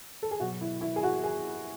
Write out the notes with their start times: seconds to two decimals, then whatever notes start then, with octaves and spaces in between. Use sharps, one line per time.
0.23 A4
0.31 G#4
0.40 B2 F#3 F#4
0.61 E4
0.81 E4
0.96 G#4
1.03 F#4
1.24 G#4